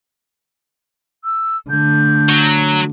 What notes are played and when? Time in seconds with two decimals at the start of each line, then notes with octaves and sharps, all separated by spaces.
1.24 E6
1.70 D3 A3 G6
2.29 F#3